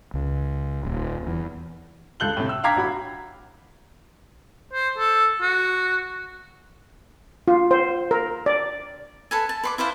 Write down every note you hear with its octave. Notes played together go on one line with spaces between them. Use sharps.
C#2
D#1
E2
C#2 A4 F#6 G6 F#7 G7
A2 C3
E6
F5 G5 A#5 D6 G#6 B6
A1 F#4 B5
C5
A4
F#4
F4
C5
A#4
D5
A4 B4 G#5
A5
B4 C6 D6
E4 B4 C5 F5